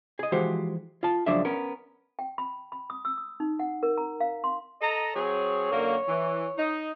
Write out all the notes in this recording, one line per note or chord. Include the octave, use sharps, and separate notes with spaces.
G#4 D#5
E3 F3 G#3 F#4 G4 C5
F4 A5
C#2 F3 F#3 D4 D5 E5
B3 C#4 A#4
G5
B5
B5
D#6
E6
D#6
D#4
F#5
A#4
A#5
F5
C6
A4 D#5 A5 A#5
F#3 C4 G#4 C#5
F#2 D3 A#3
E3
D#4